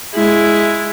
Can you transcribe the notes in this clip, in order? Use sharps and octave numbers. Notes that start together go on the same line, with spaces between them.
G#3 E4